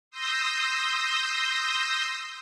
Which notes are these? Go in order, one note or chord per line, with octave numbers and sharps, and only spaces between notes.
C6 D#6 E6 G6 A#6